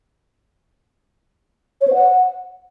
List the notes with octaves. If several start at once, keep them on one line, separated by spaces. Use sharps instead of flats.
C#5
C5
F#5